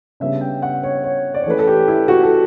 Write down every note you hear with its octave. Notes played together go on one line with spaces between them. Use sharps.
C#3 G3 B3 D4 E5
G5
F#5
C#5
C#5
D5
C#5
E3 A3 C#4 B4
A4
G4
E4
F#4
A4